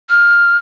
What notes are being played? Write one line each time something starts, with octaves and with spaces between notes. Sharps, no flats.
F6